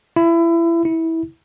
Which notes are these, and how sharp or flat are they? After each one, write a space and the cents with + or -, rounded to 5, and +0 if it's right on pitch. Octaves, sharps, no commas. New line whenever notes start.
E4 +25
E4 -20